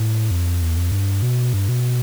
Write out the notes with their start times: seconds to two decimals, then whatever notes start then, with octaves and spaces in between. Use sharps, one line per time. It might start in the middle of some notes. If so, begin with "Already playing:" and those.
Already playing: A2
0.31 F2
0.62 E2
0.77 F2
0.92 G2
1.22 B2
1.53 G2
1.69 B2